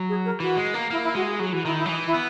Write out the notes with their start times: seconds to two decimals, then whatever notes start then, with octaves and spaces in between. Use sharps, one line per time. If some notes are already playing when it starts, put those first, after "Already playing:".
Already playing: F#3
0.08 G#4
0.25 A#4
0.40 E3 F#4
0.57 G#3
0.74 A#3
0.90 A#3 E4
1.03 E4
1.15 G#3 F#4
1.27 G#4
1.39 F#3 G#4
1.52 E3 F#4
1.65 D#3 E4
1.77 E4
1.85 F#3
1.89 E3 D#4
2.06 E4
2.14 B3